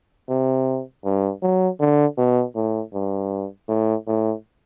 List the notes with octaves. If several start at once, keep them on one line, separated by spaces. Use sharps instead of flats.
C3
G2
F#3
D3
B2
A2
G2
A2
A2